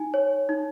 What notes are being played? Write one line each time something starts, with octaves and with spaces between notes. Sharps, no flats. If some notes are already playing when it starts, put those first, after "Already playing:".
Already playing: D#4 G#5
C#5
D#4